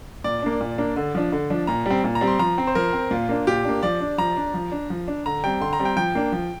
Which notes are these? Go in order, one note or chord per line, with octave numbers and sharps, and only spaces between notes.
A#2 D5
A#3 D4
A#2
A#3 D4
D3
F3 D4
D3
F3 D4
A#2 A#5
G3 C4
A#2
A#5
G3 C4
C6
F3 A#5
C4
C5
F3 A#4
C4
A#2 F4
A#3 D4
A#2 G4
A#3 D4
F3 D5
D4
F3 A#5
D4
F3
D4
F3
D4
D3 A#5
G3 C4 G5
D3 C6
A#5
G3 C4
G5
F3 G5
A#3 D4
F3